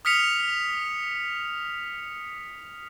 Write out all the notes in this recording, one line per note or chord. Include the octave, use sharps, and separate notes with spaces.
D#6 F6 B6 C#7 F7